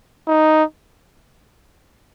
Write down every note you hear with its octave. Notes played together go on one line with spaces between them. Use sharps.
D#4